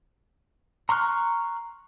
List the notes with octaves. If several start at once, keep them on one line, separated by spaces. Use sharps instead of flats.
A#5 C6 C#6 F6 F#6